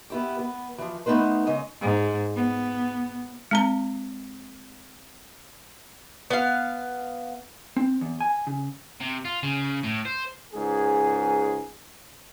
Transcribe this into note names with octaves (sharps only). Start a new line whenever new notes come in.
B3 E4 G4
B3
E3 F3
A3 B3 D4 D#4 B4 C5
C#3 G#3 D#5
G#2
B3
G#3 C4 A#5
B3 F5
C4
E2
G#5
C#3
C3
F4
C#3
A2
C5
C#2 G#2 G#4